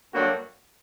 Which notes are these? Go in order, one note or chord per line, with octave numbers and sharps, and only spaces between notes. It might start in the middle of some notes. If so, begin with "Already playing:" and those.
G2 D3 F#3 A#3 F#4